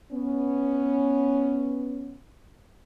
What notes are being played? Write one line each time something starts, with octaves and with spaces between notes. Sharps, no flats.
B3 C#4